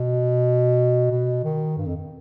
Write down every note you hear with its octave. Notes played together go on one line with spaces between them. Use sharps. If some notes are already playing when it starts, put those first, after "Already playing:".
Already playing: B2
B2
D#3
G2
F2